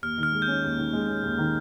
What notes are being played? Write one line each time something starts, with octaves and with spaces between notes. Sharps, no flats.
D#2 F6
D#3
F6
G#3
G6
C#4
D#2
D#3
G#3
C#4
D#2
D#3